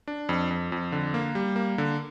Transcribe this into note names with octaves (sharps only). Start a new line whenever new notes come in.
D4
F2
F2
F2
D3
A#3
G3
A#3
D3